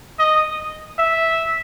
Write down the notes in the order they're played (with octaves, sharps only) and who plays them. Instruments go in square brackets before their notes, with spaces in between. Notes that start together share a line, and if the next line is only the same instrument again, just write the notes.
[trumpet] D#5
E5